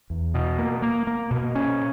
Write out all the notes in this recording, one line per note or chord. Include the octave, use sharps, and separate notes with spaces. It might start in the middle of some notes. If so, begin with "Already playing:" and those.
E2
B2
A#3
A#3
A#3
B2
C#4